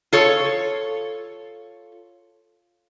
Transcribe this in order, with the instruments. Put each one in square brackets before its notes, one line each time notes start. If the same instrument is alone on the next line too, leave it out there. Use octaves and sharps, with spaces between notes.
[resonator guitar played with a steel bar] F4 A4 C#5